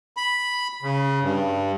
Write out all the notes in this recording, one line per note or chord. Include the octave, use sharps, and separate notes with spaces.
B5
C#3
G2